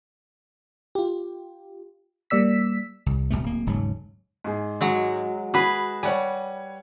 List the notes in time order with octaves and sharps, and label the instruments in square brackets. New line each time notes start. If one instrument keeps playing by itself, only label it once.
[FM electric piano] F4 G4
G3 A#3 D5 E6 B6
[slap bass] C2
F#1 C#2 B2 A3
D1 A#3
D#1 G#2 C#3 F#3
[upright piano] G#2 G#4
[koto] F#3 G#3
[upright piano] F#4 B5 [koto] G#4 B4
[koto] G3 [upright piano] C#5 F#5 G#5